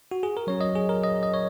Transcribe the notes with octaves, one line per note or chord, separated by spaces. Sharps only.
F#4
G#4
A#4
F#3 C#4 C#5
D#5
G#4
A#4
D#5
D#5
C#5